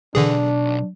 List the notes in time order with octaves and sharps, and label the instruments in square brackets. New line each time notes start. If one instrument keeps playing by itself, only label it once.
[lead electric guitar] B1 [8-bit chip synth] D3 E3 G#4 [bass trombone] D4